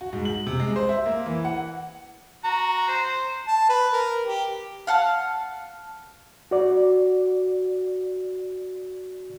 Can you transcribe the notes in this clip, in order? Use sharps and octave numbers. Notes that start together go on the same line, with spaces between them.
F#4
G#2
F#7
C3
G#3
C5
E5
A#3
E3
F#5
F#4 A#5
C5
A5
B4
A#4
G4
F5 F#5 A5 F6
F#4 D5